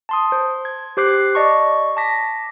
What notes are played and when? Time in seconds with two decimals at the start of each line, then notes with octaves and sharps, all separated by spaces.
0.09 A5 C6 D#6
0.32 C5
0.65 G#6
0.97 G4 C5 D6 F#6 C7
1.35 D5 D#5 A5 C#6
1.97 A5 D6 A#6 B6